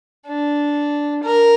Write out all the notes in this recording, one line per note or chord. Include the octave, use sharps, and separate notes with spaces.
D4
A#4